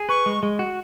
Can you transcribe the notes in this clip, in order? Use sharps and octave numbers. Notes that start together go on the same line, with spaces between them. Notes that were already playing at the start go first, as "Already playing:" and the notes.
Already playing: G#4
B4 C#6
G#3
G#3
F#4